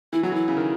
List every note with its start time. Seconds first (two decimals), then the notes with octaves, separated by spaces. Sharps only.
0.13 E3 E4
0.23 F#3 F#4
0.32 E3 E4
0.48 C#3
0.57 D#3